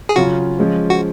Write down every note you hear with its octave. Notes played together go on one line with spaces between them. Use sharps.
G#4
C#3 F#3 C#4 F4 F#4
F3 G#3 C#4 F4
F#4